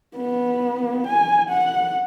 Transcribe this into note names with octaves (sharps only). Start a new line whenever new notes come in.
B3
G#5
F#5